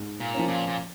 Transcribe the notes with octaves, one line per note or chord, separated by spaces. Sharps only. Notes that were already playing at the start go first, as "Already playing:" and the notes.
Already playing: G#2
A#2
F3 A#3 C#4
A#2
A#2